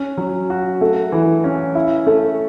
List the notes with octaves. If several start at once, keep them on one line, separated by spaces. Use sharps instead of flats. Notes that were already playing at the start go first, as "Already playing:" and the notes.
Already playing: C#4
F#3
F#4
A3
E3
C#4
E4
A3